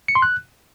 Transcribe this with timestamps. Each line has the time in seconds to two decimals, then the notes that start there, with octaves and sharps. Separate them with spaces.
0.08 C#7
0.15 C6
0.22 F#6